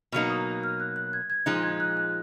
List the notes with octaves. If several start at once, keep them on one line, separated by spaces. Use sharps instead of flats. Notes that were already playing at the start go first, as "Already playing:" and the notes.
B2 F#3 A#3 D#4 F6
D#6
F6
F#6
F#6
G#6
G#6
A#2 F3 G#3 D#4 F#6
G#6
F#6
F#6